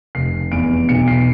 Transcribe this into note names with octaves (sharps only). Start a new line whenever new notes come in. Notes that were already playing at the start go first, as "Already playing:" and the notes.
F1 C7
E2 D7
B1 C#7
C7